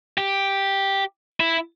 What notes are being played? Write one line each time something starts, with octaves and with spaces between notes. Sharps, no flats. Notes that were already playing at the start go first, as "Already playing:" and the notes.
G4
E4